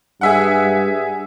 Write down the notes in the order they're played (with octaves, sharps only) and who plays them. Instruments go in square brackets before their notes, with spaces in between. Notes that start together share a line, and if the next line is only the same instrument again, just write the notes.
[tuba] G2 [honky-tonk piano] G#4 E5 F#5